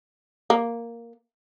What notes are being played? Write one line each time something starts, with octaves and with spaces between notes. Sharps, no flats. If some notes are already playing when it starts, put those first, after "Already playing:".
A#3